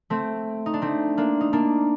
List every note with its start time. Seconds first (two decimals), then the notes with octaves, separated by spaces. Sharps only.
0.10 A3 C4
0.66 D#4
0.74 D4
0.82 A3 C4
1.17 A#3 D4
1.41 D#4
1.53 A#3 D4